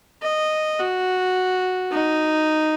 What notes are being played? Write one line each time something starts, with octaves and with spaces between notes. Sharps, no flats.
D#5
F#4
D#4